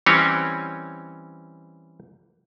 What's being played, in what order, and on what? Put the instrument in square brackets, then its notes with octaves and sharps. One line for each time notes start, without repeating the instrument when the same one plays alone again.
[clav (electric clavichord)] E3 G3 C4 C#4 C#5